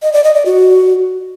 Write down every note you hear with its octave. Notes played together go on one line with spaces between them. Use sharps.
D#5
D5
D#5
D5
F#4